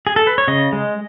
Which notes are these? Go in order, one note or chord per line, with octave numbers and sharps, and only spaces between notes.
G#4
A4
B4
C#5
C#3 D#5
G#3